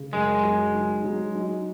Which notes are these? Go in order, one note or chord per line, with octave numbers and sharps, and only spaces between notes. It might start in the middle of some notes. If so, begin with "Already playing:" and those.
Already playing: C#3
F#2 G#3
F#3
D#4
F#3
D#4